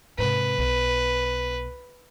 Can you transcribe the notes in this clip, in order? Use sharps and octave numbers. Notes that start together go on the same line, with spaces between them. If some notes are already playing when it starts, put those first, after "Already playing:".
G#2 C3 B4
B1